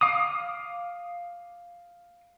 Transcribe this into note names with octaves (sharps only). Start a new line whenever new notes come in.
F5 D6 D#6